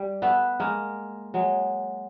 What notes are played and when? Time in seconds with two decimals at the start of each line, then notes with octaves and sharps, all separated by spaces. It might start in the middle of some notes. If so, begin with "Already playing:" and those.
Already playing: G3
0.22 A3 B3
0.60 G#3 A#3
1.34 F#3 G#3